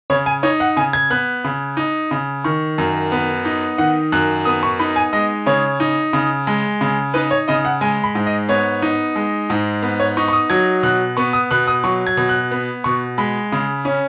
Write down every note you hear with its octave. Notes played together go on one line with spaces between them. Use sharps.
C#3 C#5
G#5
D#4 C#5
F#5
C#3 G#5
G#6
B3 F#6
C#3
D#4
C#3
D#3 C#6
F#2
B3
D#4
D#3 F#5
F#2 F#6
B3 D#6
C#6
D#4 B5
G#5
G#3 D#5
C#3 C#5
D#4
C#3
G#3
C#3
D#4 B4
C#5
C#3 D#5
F#5
G#3 G#5
B5
G#2
D#5
B3 C#5
D#4
G#3
G#2
B3
C#5
D#4 C#6
C#6
D#6
F#3 G#6
B2 F#6
B3 C#6
D#6
B2 F#6
D#6
F#3 C#6
G#6
B2
F#6
B3
B2 C#6
G#3 B5
C#3
C#4